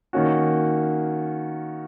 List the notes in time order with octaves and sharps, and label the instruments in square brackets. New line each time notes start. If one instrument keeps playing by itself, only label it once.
[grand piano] D#3 A#3 C#4 F#4